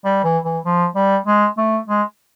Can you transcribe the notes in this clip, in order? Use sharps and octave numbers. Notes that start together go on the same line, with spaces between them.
G3
E3
E3
F3
G3
G#3
A3
G#3